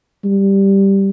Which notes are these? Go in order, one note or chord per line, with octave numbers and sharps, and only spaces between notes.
G3